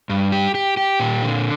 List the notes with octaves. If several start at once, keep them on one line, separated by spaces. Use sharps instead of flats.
G2
G4
G4
G4
A#2
D3